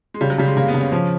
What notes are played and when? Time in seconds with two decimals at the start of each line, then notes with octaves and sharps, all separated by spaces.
0.14 G#3
0.21 C#3 G3
0.30 F#3
0.38 C#3 G3
0.47 G#3
0.57 C#3 A#3
0.68 B3
0.74 C#3
0.81 C#4
0.92 F3 C#4